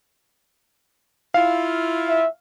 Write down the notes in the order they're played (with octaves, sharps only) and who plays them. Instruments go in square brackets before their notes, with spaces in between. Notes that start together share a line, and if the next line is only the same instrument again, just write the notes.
[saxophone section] E4 F4 [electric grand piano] F5
[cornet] E5